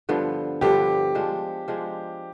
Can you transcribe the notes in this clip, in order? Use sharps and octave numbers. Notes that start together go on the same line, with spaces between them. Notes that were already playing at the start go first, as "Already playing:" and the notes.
G2 D3 F3 B3
G2 D3 F3 B3 G4
F3 G#3 D4
F3 G#3 D4